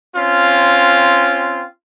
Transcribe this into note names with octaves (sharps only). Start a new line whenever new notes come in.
C4 C#4 F4